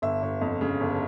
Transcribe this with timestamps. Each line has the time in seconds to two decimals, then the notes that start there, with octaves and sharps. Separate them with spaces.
0.02 G1 E5
0.22 G1
0.41 F2
0.61 C#3
0.80 G1